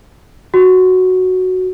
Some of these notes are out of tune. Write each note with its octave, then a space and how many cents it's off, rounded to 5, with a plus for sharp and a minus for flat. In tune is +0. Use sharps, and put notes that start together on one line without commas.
F#4 +0